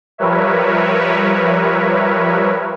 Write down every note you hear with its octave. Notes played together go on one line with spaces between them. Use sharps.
F3 G3 A#4 B4 C#5 E5